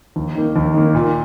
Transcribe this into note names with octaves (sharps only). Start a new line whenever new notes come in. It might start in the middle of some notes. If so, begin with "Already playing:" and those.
D#2
D#3 A#3
D#2
D#3 A#3
A#2